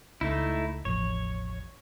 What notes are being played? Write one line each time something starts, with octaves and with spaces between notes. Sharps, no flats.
C#2 A3 D#4 E4
E1 A1 F3 C#5